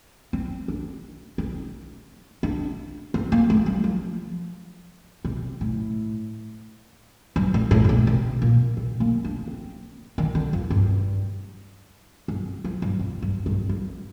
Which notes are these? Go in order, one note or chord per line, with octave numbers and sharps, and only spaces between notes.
C4
D4
D#4
D4
C4
A#3
A3
G3
F3
C3
A2
G2
A2
A2
A2
A#2
C3
A#2
C3
A#3
D4
C4
D#3
D3
F2
G2
G2
F3
G2
F2
G2
G2
G2